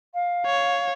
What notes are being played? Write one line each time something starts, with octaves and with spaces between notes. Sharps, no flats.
F5
C#5